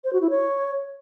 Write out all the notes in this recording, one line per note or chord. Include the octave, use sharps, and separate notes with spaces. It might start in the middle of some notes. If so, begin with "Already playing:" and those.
C5
F#4
E4
C#5